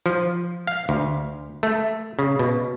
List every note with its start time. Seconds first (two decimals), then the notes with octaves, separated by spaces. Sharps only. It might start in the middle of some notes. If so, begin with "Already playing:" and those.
0.06 F3
0.67 F5
0.89 D2
1.63 A3
2.19 C#3
2.39 B2